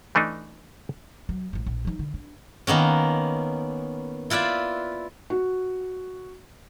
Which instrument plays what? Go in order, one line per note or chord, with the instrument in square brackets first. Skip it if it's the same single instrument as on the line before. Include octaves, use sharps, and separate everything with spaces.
[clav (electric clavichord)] E3 A3 D4 D#4
[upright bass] F#3
A1 A2
A#1
F3 D#4
D3
D4
[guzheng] D#3 A#3 B3 C#4
E4 F4 B4 D5 E5
[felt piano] F#4